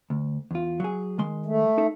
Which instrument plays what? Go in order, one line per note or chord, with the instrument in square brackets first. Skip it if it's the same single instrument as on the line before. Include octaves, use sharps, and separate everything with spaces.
[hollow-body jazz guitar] D2
E2 F4
F#3 G#4
D#3 G#3 C6
[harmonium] A3
[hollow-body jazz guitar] D#4 A4 E5